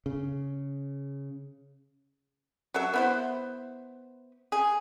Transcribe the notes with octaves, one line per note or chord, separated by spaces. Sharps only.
C#3
F#3 A4 E5
B3 E4 C5
G#4